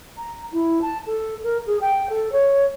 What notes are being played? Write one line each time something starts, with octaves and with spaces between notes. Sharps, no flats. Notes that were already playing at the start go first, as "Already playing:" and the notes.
A#5
E4
A5
A4
A#4
G#4
G5
A4
C#5